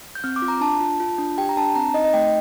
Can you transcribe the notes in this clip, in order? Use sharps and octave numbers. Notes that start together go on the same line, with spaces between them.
G6
C4 F6
D6
F4
A#5
D4 A5
F4
F4
D4
G4 G5
A#5
D4 A5
C4 A#5
D#4 D#5
D#5
A3 G5